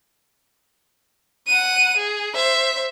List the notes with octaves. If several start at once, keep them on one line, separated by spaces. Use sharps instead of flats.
F#5 D#7
G#4
C5 E5